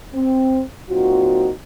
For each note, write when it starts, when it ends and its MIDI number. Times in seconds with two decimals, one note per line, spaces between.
0.14 0.61 60
0.89 1.50 46
0.89 1.50 54
0.89 1.50 60
0.89 1.50 63
0.89 1.50 65
0.89 1.50 66